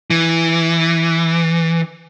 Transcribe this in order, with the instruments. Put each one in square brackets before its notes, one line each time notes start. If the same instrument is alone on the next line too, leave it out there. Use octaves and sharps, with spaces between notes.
[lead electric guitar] E3